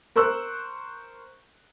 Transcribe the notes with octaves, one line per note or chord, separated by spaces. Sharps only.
A#4 C5 C#6 E6 F#6